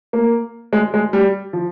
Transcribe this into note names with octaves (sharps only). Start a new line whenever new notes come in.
A#3
G#3
G#3
G3
F3